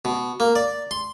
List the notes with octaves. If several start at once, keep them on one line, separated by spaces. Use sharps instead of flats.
B2
A#3
D5
C6